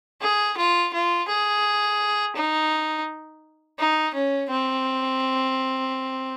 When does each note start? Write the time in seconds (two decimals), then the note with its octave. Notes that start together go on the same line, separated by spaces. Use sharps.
0.22 G#4
0.57 F4
0.94 F4
1.29 G#4
2.36 D#4
3.79 D#4
4.14 C#4
4.50 C4